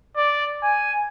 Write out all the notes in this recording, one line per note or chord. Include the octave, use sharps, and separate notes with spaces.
D5
G#5